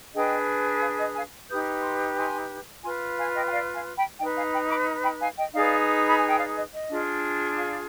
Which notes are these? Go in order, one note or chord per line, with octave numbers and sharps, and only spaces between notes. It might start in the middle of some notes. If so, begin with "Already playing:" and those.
D4 G#4 B4 D#5 G5
D5 F5
D#5
F5 G#5
D#4 G4 B4 D#6 G6
C6 D#6
G#5 C6
F4 B4 G#5 C6
F5 G#5
D#5 G5
G5
D5 F5
F5 G#5
G5 B5
D#4 B4 D#5 G5
F5 G#5
G5 B5
B5 D6
G5 B5
F5 G#5
D#5 G5
D#4 G#4 B4 D5 F5
B5
G#5
G5
D5 F5
D#5
D#5
D4 F4 G#4
D5 F5